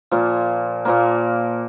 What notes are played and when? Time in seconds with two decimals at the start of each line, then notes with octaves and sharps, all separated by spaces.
0.11 A#2 F3 A#3
0.85 A#2 F3 A#3